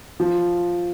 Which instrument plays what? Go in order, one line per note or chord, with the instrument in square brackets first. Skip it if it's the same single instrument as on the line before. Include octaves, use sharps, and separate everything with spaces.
[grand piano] F3